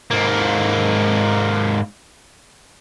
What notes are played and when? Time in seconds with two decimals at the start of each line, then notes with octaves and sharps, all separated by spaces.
0.11 G#2 A#3